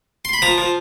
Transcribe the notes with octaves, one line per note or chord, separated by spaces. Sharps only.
C6
B5
F3 A#5
F3